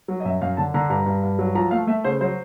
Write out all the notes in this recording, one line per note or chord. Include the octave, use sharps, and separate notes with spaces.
F#3
D#5
F#2 E5
F#2 F5
D3 A5
D3 A#5
G2 A#5
G2
G2
F#3
F3 A#5
A3 F5
A3 E5
C#3 C5
F#3 C5